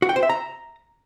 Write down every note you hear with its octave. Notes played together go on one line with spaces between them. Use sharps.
F#4
G5
C5
E5
A#5